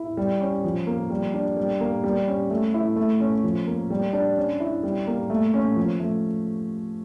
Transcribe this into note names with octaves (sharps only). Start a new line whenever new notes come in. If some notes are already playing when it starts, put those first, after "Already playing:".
Already playing: E4
G3
C#4
F3
A#3
G3
D4
G3
A#3
G3
C#4
A3
E4
A3
C#4
F3
A#3
G3
D4
C#4
E4
G3
A#3
A3
C#4
F3
A3